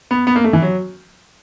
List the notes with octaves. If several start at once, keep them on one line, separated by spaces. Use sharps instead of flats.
B3
B3
A#3
A3
E3
F#3